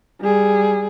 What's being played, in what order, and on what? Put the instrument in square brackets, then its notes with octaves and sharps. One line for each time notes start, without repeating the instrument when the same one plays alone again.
[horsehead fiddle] G3 G#4